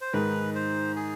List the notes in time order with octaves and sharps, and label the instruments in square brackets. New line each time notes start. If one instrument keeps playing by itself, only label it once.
[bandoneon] C5
[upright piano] G#2 D#3 G#3 [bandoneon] B4
[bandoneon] C5
G#4